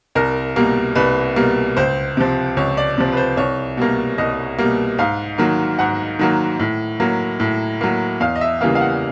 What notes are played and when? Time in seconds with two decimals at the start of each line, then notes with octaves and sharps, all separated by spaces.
0.15 C2 A#4
0.56 B2 G3 A#3
0.95 C2 B4
1.36 B2 G3 A#3
1.77 C#2 C5
2.17 C3 F3
2.57 C#2 C#5
2.77 D5
2.98 C3 F3
3.12 B4
3.17 C5
3.37 C2 C#5
3.77 B2 G3 A#3
4.18 C2 D#5
4.58 B2 G3 A#3
4.98 G#2 F5
5.38 D#3 F#3 A#3
5.79 G#2 F#5
6.19 D#3 F#3 A#3
6.60 A2
7.00 F#3 A#3
7.40 A2
7.81 F#3 A#3
8.20 E2 F5
8.36 D#5
8.41 E5
8.61 C#3 E3 G3 A#3 F5
8.75 F5
8.81 F#5